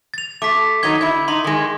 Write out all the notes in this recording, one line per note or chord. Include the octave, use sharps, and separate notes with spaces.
A6 F7
A3 D6 B6
D#3 F#3 D#4 G#6 G7
D3 E4 G#6
D#4 C6
D#3 G#3